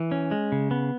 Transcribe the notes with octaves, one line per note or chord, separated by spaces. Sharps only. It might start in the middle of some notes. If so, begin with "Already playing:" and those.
Already playing: E3
C#4
G#3
C#3
B3